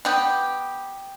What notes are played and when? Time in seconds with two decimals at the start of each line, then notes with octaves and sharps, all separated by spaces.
0.05 B3 G4